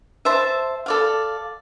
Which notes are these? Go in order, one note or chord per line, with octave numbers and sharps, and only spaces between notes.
C5 E5 A5
A4 D5 F5